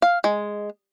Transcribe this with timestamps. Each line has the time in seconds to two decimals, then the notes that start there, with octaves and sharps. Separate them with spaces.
0.02 F5
0.24 G#3